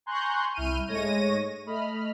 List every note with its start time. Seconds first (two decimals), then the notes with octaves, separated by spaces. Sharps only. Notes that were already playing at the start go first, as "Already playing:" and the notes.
0.06 G#5 A#5 C6 C#6 F#6 G6
0.54 C2 E4 F6 G6 D#7
0.87 G#2 G#3 A3 C#5 A#6 D#7
1.66 A3 D#5 B5 F6